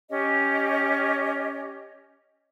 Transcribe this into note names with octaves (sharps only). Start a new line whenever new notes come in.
C#4 G4 C#5 D#5